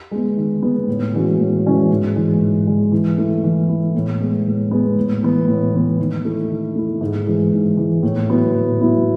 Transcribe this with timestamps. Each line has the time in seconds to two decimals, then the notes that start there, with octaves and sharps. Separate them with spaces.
0.11 G#3 B3
0.37 D#3
0.63 G#3 B3
0.88 A2
1.13 E3 G#3 C#4 F#4
1.38 A2
1.64 E3 G#3 C#4 F#4
1.90 G#2
2.16 E3 G#3
2.41 G#2
2.67 E3 G#3
2.92 E3
3.18 A3 E4
3.44 E3
3.69 A3 E4
3.95 A2
4.20 G#3 B3
4.46 A2
4.71 G#3 B3
4.97 A2
5.22 E3 B3
5.47 A2
5.73 E3 B3
5.99 D#3
6.25 A3 E4
6.49 D#3
6.76 A3 E4
7.01 G#2
7.27 E3 G#3
7.52 G#2
7.77 E3 G#3
8.03 A2
8.29 F#3 B3 E4
8.55 A2
8.80 F#3 B3 E4